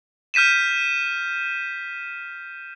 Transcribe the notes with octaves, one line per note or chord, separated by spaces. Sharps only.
F6 G6 B6 D#7 E7